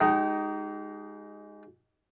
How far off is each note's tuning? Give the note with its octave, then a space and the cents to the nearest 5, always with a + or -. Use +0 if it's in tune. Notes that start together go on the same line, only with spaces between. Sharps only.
G#3 +0 D#4 +0 G4 -40